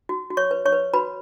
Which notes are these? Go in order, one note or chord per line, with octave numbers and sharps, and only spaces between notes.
F#4
F#4
C#5 C#6
B4
C#5 C#6
B4
F#4 B4 B5